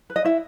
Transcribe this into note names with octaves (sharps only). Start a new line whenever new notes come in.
B4
D#5
E4 E5